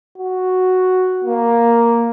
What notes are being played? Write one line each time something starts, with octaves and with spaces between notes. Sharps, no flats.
F#4
A#3